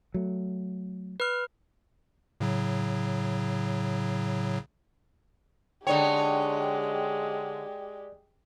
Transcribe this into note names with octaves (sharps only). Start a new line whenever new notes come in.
F#3 A3
B4 F6
A2 C#3 F#3
D3 G#3 D#4 G4 C#5 D5 G5